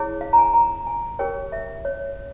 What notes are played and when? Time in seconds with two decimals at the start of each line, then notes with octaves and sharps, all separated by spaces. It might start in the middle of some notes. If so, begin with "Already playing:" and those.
Already playing: E4 G#4 C#5
0.21 F5
0.33 A#5
0.38 G#5
0.54 A#5
0.87 G#5
1.19 G4 A#4 C#5 G5
1.52 E5
1.85 C#5